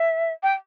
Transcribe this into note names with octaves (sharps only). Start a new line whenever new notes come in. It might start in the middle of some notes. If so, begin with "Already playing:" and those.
Already playing: E5
G5